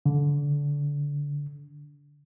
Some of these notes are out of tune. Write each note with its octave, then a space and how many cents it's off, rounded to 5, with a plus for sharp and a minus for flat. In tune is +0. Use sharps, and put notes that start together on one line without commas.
D3 -25